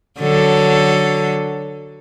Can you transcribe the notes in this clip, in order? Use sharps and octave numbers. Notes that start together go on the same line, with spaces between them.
D3 F#3 A4